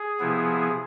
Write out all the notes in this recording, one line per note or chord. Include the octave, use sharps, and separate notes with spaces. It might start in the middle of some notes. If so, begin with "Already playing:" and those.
Already playing: G#4
C3 F3 B3 E4